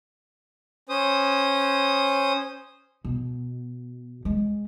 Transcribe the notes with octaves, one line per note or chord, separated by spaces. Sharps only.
C#4 C5 D#6
B2
G#3